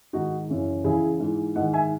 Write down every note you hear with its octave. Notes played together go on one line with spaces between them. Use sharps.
G#2 D#3 D#4 F#4
F#2 C#3 E3
E2 C#3 E3 E4 G#4
G#2 E3
G#2 D#3 D#5 F#5
E5 G#5